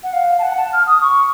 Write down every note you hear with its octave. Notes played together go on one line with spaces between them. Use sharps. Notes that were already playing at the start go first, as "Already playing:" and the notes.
F#5
F5
A5
F#5
A5
F6
D#6
C#6